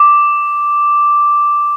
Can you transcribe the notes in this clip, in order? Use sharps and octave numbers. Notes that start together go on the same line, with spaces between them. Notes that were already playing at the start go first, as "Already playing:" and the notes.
Already playing: D6